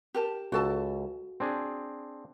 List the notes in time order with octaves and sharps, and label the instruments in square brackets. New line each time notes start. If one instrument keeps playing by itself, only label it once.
[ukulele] G4 A#4 A5
[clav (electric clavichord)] C#2 [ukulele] F#4 A4 A5
[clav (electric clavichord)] C4 D4 G#4